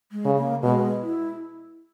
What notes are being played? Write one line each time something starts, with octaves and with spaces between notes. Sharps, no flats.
G#3
C#3
A#3
B2 G#3
E4